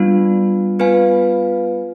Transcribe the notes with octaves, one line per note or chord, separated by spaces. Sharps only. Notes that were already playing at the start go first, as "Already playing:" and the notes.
Already playing: G3 B3 D4 F4
B3 F4 B4 F5 G#5